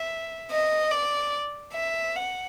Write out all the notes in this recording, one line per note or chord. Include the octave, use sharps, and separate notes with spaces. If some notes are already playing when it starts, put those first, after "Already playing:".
Already playing: E5
D#5
D5
E5
F#5